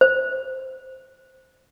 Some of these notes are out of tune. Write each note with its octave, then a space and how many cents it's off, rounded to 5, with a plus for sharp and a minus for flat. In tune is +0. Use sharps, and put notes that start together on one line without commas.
C5 +0